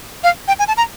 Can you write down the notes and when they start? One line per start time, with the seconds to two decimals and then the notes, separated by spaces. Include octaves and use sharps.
0.24 F5
0.48 G5
0.59 G#5
0.68 A5
0.77 A#5